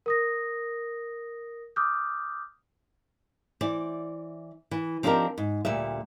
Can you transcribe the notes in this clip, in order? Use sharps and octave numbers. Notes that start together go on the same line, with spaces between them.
A#4 D#6 A#6
D6 D#6 F6 G6
E3 C5 D5
E3
F3 C4 D4 D#4 G4 A#4
G#2
D2 A#2 G3 E5